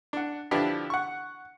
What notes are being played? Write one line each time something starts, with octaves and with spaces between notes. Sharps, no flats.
D4 F#5
D3 F3 D4 E4 G4 B4
F#5 C#6